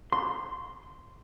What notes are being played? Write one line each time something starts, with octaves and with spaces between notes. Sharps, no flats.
C6